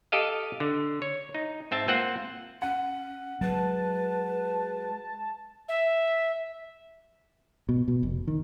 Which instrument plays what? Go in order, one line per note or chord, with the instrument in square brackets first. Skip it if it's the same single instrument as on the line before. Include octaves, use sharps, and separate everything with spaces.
[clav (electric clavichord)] G4 A4 D#5 F5
D3
C#5
D#4
G#2 C4 E5 A5
A#3 C4 F4 C5 F#5
[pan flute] C#4 [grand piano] F#5
[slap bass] F#3 G#3 [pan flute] B4 [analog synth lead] A5
[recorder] E5
[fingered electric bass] B2
B2
F1
D#3